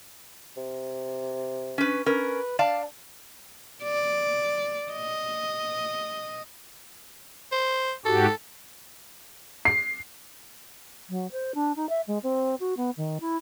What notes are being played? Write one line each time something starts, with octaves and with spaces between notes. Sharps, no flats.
C3
C#4 B4
C#4 A#4 B4
D4 D5 F5 A5
D5
D#5
C5
G#2 F#4 G4 A4
C7
F#3
C5
D4
D#4
E5
G#3
C4
F#4
B3
D#3
E4